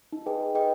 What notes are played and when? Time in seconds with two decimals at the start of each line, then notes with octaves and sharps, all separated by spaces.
0.12 D#4
0.26 G#4 B4 D#5 G5
0.41 D#4
0.55 G#4 B4 D#5 G5